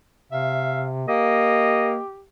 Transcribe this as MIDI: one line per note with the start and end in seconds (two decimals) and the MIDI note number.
0.32 1.05 48
0.32 0.85 76
0.32 0.87 77
1.08 1.98 58
1.08 2.25 67
1.08 1.99 75